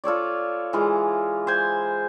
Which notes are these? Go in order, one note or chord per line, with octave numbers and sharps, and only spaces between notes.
F4 A4 C#5 D5
E3 G#3 F4
C5 G#5